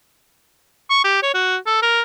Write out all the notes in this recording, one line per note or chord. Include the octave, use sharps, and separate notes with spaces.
C#6
G4
C#5
F#4
A4
A#4